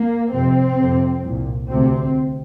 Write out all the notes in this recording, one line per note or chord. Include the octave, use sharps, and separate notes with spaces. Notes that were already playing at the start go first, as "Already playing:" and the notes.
Already playing: A#3
F2 C3 C4
F2 C3
C2 A#2
D2 C3 C4